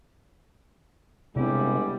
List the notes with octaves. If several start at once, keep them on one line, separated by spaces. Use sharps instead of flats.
G1 C3 G3 G#3 C4 E4